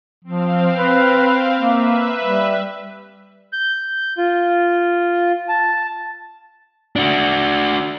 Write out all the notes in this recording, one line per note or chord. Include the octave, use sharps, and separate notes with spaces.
F3 C4 F5
B4
A#3 B4 E5
G3
G6
F4
A5
D4 F#4